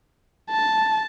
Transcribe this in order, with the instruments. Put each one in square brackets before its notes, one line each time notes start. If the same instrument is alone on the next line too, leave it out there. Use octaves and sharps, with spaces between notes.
[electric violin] A5